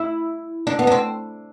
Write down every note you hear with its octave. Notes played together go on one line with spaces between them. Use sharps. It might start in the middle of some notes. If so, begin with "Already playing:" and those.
Already playing: E4
D4
B3
D4
C4